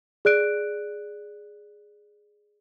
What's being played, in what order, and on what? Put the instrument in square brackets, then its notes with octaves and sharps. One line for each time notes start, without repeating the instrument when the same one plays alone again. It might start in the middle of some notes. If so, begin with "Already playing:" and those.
[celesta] G#4 D5 F#6 D7